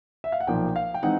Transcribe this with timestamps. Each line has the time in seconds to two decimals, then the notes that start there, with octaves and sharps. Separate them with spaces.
0.24 E5
0.32 F5
0.40 F#5
0.47 B1 A#2 F3 A#3 G5
0.76 F5
0.94 G5
1.03 E3 G#3 C4 D#4 F#5